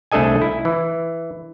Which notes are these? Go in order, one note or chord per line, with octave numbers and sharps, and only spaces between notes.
C2 A3 D4 A4 D#5 G#5
E4
E3